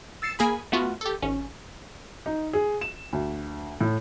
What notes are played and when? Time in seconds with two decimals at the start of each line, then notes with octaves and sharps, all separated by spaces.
0.22 E6 A6 C7 C#7 E7
0.39 A#3 G#4 G#5 B5
0.72 A3 B3 F4 F#4
1.01 G4 A4
1.22 G#1 C#4
2.26 D#4
2.53 G#4
2.81 E7
3.13 D2
3.81 A2